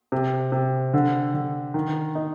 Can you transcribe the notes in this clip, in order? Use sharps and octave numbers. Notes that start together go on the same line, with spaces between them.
C3
C3
D3
D3
D#3
D#4